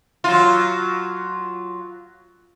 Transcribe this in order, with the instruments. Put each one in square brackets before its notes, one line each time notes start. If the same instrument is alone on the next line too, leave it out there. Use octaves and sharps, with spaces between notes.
[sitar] F#3 F4